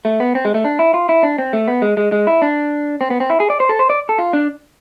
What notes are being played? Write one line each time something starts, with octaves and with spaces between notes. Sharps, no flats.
A3
B3
C4
G#3
A3
D4
E4
F4
E4
D4
C4
A3
B3
G#3
G#3
G#3
E4
D4
C4
B3
C4
E4
G#4
D5
C5
A4
C5
D5
A4
F4
D4